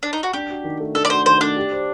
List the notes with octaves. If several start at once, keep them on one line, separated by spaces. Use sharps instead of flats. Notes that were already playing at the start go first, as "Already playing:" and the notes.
D4
D#4
F#4
D4 G4
F#4
D#3
A3
D4 A4
D5
F#4 C5
D#3 C5
A3 D4
G4
C5